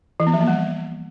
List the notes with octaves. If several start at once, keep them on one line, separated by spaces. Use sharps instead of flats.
E3
B3
F3
A#3
G3